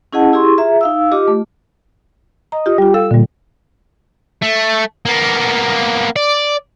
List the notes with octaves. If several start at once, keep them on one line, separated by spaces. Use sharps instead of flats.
C#4 E4 G#4 D#5 F#5 A5
E4 G4 G#4 C6 C#6
F4 G#4 E5 A#5
D#4 F5 E6
F4 G4 D#5 D6
A3
D#5 A#5
F4 G4
G3 F4 G4
A4 F5 G5 E6
A#2 D3 G3
A3
A#3 B3
D5